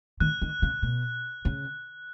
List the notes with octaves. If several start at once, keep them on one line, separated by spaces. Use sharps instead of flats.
D#3 F#6
D#3
C#3
B2
C#3